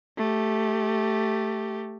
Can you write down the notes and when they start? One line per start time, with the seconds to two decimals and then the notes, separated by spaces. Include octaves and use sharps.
0.17 A3 G4